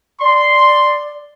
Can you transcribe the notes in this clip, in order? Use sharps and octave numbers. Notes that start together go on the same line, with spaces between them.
D5 C6